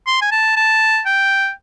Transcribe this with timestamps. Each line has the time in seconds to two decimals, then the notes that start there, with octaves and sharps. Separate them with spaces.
0.07 C6
0.21 G#5
0.31 A5
0.56 A5
1.06 G5